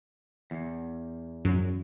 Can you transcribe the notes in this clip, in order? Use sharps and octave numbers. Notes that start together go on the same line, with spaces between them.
E2
F#2